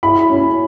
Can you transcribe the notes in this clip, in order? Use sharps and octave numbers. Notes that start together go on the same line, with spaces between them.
E4 B5
C#4